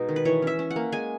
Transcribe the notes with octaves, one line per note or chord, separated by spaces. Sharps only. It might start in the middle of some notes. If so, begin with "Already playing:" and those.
Already playing: B2 G#3 D#4
D#3
B4
E3 C#5
C#4 E5
C#4
F#5
A#3
G#3 G#5